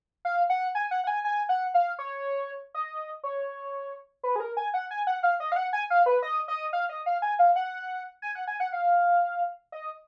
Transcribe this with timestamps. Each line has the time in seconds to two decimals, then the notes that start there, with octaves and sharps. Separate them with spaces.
0.25 F5
0.50 F#5
0.75 G#5
0.91 F#5
1.04 F#5
1.07 G#5
1.25 G#5
1.49 F#5
1.74 F5
1.99 C#5
2.75 D#5
3.24 C#5
4.24 B4
4.36 G#4
4.40 A#4
4.57 G#5
4.74 F#5
4.91 G#5
5.07 F#5
5.23 F5
5.40 D#5
5.52 F5
5.56 F#5
5.73 G#5
5.90 F5
6.06 B4
6.22 D#5
6.48 D#5
6.73 F5
6.89 D#5
7.06 F5
7.22 G#5
7.39 F5
7.56 F#5
8.22 G#5
8.35 F#5
8.47 G#5
8.60 F#5
8.73 F5
9.72 D#5